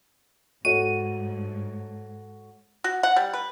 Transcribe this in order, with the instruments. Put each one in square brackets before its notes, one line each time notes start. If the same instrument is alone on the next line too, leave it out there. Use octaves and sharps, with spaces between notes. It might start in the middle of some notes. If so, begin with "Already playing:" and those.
[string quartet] G#2 [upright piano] F#4 A4 C#5 [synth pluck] D#7
[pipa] F#4
F#5
G3
B4